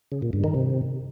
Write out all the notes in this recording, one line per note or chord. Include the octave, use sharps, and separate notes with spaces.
C#3
A#2
G2
D#3
C3